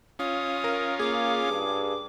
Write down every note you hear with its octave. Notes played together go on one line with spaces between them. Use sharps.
C#4 F4 D#6
A#4
A#3 G#4 D6
G2